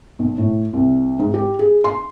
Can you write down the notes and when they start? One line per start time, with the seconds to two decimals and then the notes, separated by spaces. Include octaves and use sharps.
0.19 B1
0.38 A2
0.73 C2
1.19 G#2
1.34 G4
1.59 G#4
1.84 C6